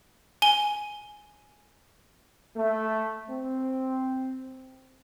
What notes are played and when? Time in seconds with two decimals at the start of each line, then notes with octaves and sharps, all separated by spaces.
0.42 G#5 G7
2.57 A3
3.30 C4